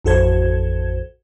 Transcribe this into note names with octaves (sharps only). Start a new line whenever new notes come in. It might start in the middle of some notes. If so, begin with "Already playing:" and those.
A1 F2 F#4 A4 C5 G#6